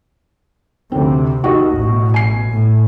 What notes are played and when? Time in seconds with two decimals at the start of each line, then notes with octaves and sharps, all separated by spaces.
0.92 D2 C3 C4
1.44 D#2 F#4 G4 D#5
1.77 A1 B2
2.14 G#5 C7
2.49 A2